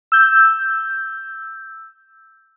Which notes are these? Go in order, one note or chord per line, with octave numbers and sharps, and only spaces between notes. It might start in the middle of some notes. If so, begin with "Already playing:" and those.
E6 G6